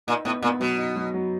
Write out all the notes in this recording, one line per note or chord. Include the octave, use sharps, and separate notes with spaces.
A#2 D#4
A2 B3
A#2 B3
B2 F#3
D#4
F#3
F#3